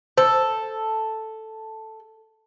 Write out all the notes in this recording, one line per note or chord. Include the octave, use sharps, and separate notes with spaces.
A4 C5